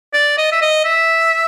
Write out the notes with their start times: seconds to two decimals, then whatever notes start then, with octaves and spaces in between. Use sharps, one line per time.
0.14 D5
0.38 D#5
0.52 E5
0.61 D#5
0.85 E5